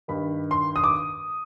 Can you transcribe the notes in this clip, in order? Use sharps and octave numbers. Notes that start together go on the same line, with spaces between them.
G2 D#3 B5
C6
D#6
D6